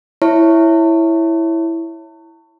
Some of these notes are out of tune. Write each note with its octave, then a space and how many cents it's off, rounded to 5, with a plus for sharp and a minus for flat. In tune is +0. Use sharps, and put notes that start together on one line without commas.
E4 +0 C#5 +0